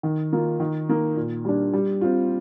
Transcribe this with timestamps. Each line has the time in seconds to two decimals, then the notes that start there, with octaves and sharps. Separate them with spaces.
0.03 D#3
0.33 A#3 F4
0.60 D#3
0.89 A#3 D#4
1.16 A#2
1.45 G3 D4
1.73 G3
2.01 C4 F4